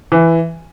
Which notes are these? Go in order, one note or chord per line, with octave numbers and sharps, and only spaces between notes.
E3